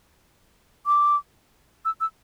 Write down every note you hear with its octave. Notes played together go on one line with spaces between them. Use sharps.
D6
E6
E6